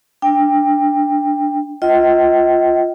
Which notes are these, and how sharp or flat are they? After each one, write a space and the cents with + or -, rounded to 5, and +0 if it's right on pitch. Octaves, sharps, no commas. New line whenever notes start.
D4 +0 G5 +20
F4 +0 D#5 +30 G5 -35